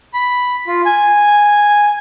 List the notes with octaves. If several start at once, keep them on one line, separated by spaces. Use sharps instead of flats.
B5
F4
G#5